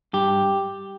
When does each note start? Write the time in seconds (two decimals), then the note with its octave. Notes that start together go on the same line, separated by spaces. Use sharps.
0.13 G2 G4